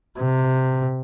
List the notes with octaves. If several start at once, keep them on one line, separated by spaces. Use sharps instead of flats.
C3